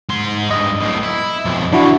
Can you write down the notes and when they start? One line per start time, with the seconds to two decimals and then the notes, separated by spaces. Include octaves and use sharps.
0.09 G#2 C6
0.51 G2 D#5
0.81 B1 A2
1.03 E4
1.45 B1 F2
1.73 E3 F3 D4 E4 F#4